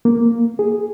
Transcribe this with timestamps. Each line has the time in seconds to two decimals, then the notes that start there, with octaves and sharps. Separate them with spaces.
0.05 A#3
0.59 G#4